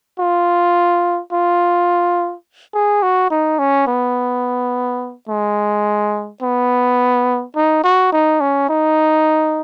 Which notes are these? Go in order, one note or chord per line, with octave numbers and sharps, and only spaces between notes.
F4
F4
G#4
F#4
D#4
C#4
B3
G#3
B3
D#4
F#4
D#4
C#4
D#4